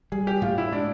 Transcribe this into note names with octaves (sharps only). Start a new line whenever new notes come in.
G3 G#4
G4
A2 F4
E4
G#3 D4